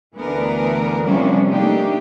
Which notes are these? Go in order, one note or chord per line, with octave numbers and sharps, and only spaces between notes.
D2 E3 B3 D4 A#4
C3 F3 G3 C#4 D4
A3 A#3 D4 D#4 G4